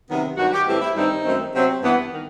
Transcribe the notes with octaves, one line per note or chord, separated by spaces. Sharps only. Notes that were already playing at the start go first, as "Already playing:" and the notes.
C3 D#3 F#3 B3
G2 D#3 F#3 F#4
G4
A2 E3 G3 C4 G4
E4
G2 D#3 G3 C4 D#4
F#2 D#3 A3 C4
C3 F#3 C4
G2 E3 B3
D#3